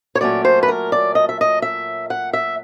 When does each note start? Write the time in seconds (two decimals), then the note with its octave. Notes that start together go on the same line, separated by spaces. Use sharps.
0.15 C#5
0.21 A#2 F#3 A3 C#4 D5
0.45 C5
0.63 B4
0.68 A#4
0.92 D5
1.15 D#5
1.29 E5
1.41 D#5
1.62 E5
2.10 F#5
2.33 E5